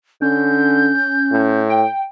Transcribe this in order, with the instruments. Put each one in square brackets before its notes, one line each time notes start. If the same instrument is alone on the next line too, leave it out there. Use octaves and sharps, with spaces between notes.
[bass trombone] D3 [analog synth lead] C#4 [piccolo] G6
[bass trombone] A2
[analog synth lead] G5